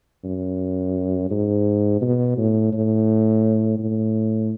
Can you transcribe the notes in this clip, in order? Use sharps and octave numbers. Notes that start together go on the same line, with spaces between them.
F#2
G#2
B2
A2
A2
A2